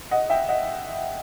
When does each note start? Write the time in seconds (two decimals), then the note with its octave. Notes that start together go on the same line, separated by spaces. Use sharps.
0.11 D#5 F#5
0.30 E5 G5
0.49 D#5 F#5